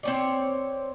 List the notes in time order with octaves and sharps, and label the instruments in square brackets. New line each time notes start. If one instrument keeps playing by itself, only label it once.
[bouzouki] C4 C#5 D5